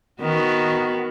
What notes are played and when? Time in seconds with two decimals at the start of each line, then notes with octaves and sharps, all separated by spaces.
0.21 D#3 B3 F#4